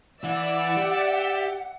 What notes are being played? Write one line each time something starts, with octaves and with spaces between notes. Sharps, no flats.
E3 D5 E5 F#5 E6
G4